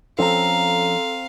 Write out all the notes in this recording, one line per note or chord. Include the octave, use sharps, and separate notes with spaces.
F3 C4 C#4 A4 F5 A#5